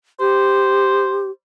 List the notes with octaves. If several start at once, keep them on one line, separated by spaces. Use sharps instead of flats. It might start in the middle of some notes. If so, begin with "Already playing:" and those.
G4 C5